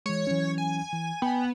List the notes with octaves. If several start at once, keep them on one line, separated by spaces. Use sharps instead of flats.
E3 G#3 C#5
E3 F#3 C#4
G#5
E3
B3 G5 G#5